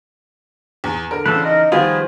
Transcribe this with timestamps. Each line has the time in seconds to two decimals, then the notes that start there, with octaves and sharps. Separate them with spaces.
0.84 E2
1.11 D3 A#4
1.26 C#3 E3 C4 A4 B4
1.45 D#4 A#4
1.72 D#3 F3 G3 B3 F4 G#4